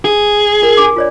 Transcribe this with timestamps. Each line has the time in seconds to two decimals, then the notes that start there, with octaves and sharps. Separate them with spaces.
0.05 G#4
0.62 F4 A#4
0.77 D4 G#5 D6
0.96 F4 C#5 D5